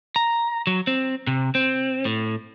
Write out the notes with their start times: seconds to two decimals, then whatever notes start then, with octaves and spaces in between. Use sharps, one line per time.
0.16 A#5
0.67 F#3
0.87 C4
1.27 C3
1.55 C4
2.05 A2